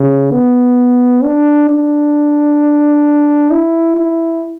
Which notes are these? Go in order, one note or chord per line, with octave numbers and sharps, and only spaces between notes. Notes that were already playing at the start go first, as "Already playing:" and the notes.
Already playing: C#3
B3
D4
D4
E4
E4